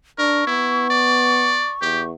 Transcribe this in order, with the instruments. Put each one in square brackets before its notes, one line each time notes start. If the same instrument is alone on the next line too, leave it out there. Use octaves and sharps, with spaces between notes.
[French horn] D4 [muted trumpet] A#4 [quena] C#6
[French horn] B3 [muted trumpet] E4
[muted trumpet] D5
[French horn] E2 [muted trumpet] G4